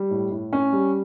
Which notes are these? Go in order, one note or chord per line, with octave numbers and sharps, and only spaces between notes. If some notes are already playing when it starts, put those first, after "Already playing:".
Already playing: G3
A2
A2
C#4
G3